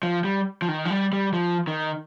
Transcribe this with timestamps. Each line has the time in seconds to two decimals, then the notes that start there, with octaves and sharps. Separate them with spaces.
0.03 F3
0.24 G3
0.62 F3
0.68 D#3
0.85 F3
0.91 G3
1.13 G3
1.34 F3
1.67 D#3